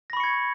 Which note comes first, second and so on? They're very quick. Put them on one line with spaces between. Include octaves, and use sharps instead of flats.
A#6 B5 C#6 C#7 G#6